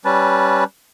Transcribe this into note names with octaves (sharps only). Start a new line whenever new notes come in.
G3 C#4 B4 A5